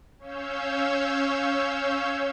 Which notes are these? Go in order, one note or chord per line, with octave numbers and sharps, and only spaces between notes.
C#4 C#5 F5 E6 G6